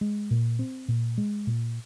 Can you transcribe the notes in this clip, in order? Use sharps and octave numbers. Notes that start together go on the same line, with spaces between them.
G#3
A#2
C4
A#2
G#3
A#2